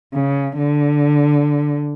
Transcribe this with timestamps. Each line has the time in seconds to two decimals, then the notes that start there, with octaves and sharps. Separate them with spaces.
0.14 C#3
0.58 D3